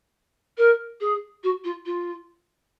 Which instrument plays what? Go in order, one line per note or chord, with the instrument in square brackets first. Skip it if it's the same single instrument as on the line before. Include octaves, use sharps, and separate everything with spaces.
[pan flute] A#4
G#4
F#4
F4
F4